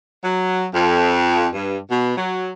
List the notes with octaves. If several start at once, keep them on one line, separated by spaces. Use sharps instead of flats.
F#3
F2
G2
B2
F#3